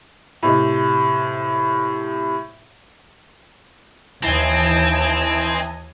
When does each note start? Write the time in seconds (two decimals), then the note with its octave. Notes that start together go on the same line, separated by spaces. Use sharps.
0.43 A2 C3 D#5
4.23 D#2 E3 C4 D#5 G#5 A5